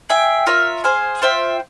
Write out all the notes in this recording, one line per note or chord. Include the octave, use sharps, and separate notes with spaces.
G#4 E5 G5
F4 A#4 C#5 E5
G#4 C5 F5 G#5
F4 C5 E5 G5